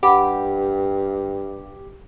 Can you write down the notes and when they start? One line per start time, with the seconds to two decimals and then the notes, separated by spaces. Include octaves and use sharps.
0.03 G2 G4 F#5 B5 D6